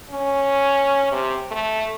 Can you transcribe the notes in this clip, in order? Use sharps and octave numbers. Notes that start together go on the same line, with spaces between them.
C#4
C3
A3